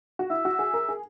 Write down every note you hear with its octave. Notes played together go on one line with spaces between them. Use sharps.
F#4
E4 E5
F#4
G#4
A#4
G#4